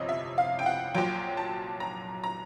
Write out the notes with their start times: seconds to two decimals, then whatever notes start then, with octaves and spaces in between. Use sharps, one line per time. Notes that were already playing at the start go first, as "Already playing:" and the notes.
Already playing: G1 F2 C3 F3 C#5 D#5
0.09 E5
0.38 F5
0.59 G5
0.66 F#5
0.94 A#1 A#2 F#3 G5
1.37 A5
1.80 A#5
2.24 A#5